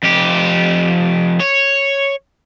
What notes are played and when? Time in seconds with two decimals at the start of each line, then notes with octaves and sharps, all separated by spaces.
0.03 F2 G4
1.40 C#5